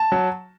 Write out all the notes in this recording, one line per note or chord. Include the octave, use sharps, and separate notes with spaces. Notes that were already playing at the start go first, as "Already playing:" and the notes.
Already playing: A5
F#3